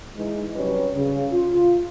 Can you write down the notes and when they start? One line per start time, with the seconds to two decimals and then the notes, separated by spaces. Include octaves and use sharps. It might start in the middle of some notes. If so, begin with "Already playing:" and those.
0.17 E3 G#3 D#4
0.56 C3 F#3 G3 C#4 B4 C#5
0.95 C#3
1.32 F4